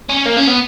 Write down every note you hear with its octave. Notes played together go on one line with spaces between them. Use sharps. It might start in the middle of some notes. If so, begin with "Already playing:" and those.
C#4
A#3
C#4
B3